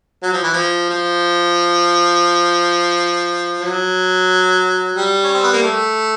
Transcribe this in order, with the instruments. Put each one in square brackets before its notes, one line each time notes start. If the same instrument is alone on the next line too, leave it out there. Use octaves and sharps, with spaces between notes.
[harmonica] F#3
F3
E3
F3
F3
F#3
G3
C#4
C4
B3
A#3
A3